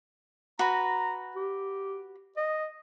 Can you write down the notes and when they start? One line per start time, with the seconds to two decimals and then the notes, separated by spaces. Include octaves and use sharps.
0.59 F#4 B4 A#5
1.36 G4
2.37 D#5